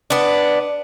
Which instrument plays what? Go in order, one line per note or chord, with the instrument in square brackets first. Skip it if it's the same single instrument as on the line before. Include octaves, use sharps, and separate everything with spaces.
[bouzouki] B3 D4